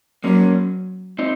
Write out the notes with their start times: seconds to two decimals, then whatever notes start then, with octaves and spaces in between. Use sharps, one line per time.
0.24 F#3 A#3 C#4
1.19 C4 D#4